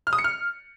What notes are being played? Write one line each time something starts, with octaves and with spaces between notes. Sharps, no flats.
F6
D#6
C#7
F6